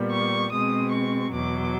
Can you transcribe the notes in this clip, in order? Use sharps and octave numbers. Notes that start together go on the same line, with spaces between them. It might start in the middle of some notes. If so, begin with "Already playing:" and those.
Already playing: A#2 G3 B3
C#6
B2 G#3 C4 D#6
C#6
E2 B2 F#3 D6